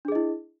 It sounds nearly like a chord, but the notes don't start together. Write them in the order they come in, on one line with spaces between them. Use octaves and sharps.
D4 G#4 D#5 E4